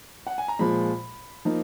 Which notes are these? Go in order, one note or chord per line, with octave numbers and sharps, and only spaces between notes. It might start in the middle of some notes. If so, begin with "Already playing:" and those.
F#5
G#5
A#5
A#2 F3 G#3 B5
F3 A#3 D#4